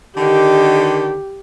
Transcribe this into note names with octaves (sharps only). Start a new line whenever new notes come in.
D3 D#3 G4